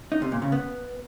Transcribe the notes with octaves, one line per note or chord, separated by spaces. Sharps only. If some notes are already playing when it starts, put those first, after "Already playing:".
D#4
C3
A#2
C#3
B3